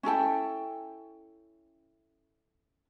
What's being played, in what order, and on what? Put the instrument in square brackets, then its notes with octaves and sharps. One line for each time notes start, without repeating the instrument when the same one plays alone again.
[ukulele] C#4 E4 A4 G5